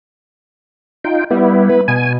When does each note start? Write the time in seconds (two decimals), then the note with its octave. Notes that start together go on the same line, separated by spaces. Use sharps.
1.04 D#4 F4 G5
1.31 G3 B3 E4
1.70 B4
1.88 B2 G#5